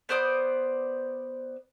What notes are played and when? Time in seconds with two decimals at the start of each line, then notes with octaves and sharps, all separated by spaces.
0.09 B3 C5 D5 D#6